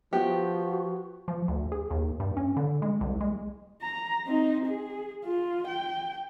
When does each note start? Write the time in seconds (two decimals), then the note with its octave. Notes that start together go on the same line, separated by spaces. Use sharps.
0.13 F3 B3 F#4 G4
1.28 F3
1.48 D2
1.72 G#4
1.91 D#2
2.20 G2
2.37 C#4
2.57 D3
2.82 G#3
3.01 C2
3.21 G#3
3.82 A#5
4.26 C4 D#4
4.66 G#4
5.25 F4
5.68 G5